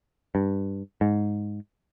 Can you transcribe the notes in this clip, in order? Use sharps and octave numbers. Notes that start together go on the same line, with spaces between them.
G2
G#2